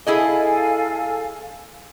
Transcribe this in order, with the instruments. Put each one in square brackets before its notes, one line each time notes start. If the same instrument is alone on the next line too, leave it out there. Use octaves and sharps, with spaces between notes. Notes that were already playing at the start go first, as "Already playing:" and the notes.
[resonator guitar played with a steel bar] E4 G#4 D#5 [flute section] A4 F5 G#5